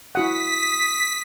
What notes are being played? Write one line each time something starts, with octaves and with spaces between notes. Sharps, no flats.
E4 F#4 F#5 D#6 B6